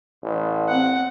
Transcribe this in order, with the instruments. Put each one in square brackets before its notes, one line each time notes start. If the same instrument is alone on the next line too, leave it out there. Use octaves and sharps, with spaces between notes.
[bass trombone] A1
[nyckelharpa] C4 F#5